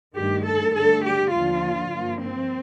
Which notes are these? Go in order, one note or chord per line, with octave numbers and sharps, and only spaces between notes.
G2 D#3 A3 G4
A4
G2 D3 A3 A4
G4
D#2 D3 F3 F4
G2 F3 A#3
C4